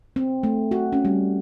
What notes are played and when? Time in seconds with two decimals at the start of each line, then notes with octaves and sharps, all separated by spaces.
0.16 C4
0.43 A3
0.71 F#4
0.93 C#4
1.05 G3